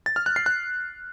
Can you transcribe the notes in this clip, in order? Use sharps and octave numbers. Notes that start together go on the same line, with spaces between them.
A6
F6
F#6
C7
F#6